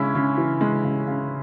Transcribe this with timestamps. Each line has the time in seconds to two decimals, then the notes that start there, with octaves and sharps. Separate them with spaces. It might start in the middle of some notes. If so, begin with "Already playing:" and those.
Already playing: C#3 G#3 C#4 E4
0.15 C#3
0.38 E3
0.61 G#3
0.84 C#3
1.07 C#3